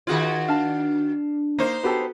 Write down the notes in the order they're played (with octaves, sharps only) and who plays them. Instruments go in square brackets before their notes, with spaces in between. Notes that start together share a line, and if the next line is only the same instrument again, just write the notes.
[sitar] D#3 F#4 D5 [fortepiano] F4 G#4 [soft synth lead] G#6
[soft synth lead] D4 [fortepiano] F5 A5
[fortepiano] A#3 [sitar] D#4 C5
[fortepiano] B3 G4 A4 [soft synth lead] F#4